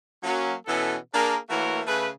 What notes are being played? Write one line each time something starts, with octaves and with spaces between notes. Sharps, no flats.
F#3 A#3 C#4
B2 E3 B3 C#4 A4
A#3 D4 G#4 A#4
E3 A3 A#3 F#4 A#4 C#5
C#3 A3 G#4 B4